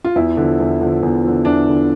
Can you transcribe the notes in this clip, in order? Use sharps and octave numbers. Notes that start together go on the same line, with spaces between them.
F4
E2 E4
D3 F3
E2
D3 F3
E2
D3 F3
E2 D4
D3 F3